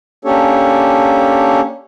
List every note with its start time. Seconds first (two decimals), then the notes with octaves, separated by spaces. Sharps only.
0.25 A#3 C#4 D4 G4 A4 C#5